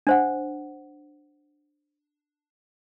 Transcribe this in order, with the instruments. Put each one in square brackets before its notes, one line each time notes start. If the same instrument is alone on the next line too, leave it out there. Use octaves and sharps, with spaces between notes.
[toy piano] D4 C5 F#5